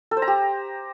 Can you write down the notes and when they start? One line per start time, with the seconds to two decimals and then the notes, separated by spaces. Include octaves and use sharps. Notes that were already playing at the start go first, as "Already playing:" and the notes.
0.11 A4
0.17 C5
0.22 A#5
0.28 G4